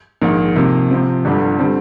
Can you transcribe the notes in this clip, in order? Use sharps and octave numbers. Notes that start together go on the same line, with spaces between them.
A#1 G#2 D#3 A#3
C3 F3 A#3 D#4
C3 F3 C4
G1 G2 D3 G3 D4
D3 G3 C4